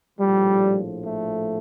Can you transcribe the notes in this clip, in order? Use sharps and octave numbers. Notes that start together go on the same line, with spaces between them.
A#1 A2 F3 G3
A3